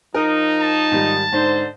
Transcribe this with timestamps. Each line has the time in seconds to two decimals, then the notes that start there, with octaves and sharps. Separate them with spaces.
0.14 F3 D#4 A#4
0.61 A5
0.91 G#2 D#3 G3
1.32 G#2 D3 C5